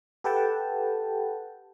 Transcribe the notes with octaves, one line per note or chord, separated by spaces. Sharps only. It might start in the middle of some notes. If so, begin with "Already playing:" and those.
G4 A4 B4 F#5 G5 A5